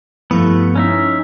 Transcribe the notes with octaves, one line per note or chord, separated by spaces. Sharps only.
G2 F3 A3 B3 E4
C#4 D#4 E5